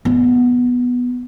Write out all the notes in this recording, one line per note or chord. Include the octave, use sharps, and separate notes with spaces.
B3